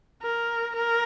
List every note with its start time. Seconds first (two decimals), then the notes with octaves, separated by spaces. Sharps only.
0.23 A#4
0.76 A#4